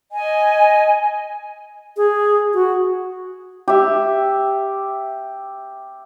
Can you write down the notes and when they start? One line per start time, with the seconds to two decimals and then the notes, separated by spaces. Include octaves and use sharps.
0.11 D#5 G#5
1.97 G#4
2.54 F#4
3.68 G4 E5